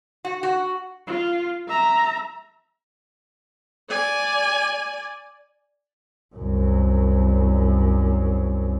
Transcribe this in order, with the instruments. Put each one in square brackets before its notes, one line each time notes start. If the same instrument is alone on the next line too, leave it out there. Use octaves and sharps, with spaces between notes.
[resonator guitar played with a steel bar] F#4
F#4
[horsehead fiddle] F4
E5 A#5
[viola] D5 G#5
[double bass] C2 F#2